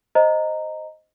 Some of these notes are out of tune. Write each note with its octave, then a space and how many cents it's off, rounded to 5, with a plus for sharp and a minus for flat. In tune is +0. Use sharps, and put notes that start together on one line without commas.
C5 +0 D#5 +0 A#5 -10